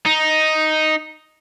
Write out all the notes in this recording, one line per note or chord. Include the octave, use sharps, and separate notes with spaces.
D#4